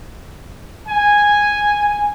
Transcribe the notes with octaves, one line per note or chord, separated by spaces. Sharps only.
G#5